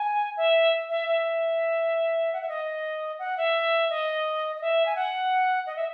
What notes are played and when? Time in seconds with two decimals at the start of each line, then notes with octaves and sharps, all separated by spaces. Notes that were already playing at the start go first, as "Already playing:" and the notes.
Already playing: G#5
0.37 E5
0.89 E5
1.08 E5
2.33 F#5
2.41 E5
2.48 D#5
3.19 F#5
3.37 E5
3.90 D#5
4.56 D#5
4.62 E5
4.86 G#5
4.96 F#5
5.66 D#5
5.76 E5